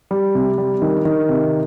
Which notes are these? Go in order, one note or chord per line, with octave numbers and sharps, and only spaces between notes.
G3
C3
G3
D#3
D#3
C3